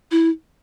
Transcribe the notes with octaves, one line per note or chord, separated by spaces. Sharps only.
E4